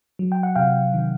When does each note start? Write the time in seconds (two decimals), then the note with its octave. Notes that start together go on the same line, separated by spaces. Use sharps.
0.19 F#3
0.32 G5
0.43 F#5
0.55 C3 F5 G5
0.94 D#3